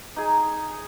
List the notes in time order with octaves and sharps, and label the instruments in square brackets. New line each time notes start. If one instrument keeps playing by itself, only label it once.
[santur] D#4 G#4